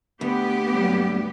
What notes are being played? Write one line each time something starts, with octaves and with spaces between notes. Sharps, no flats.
D2 B3 G4
G2 F#3 G3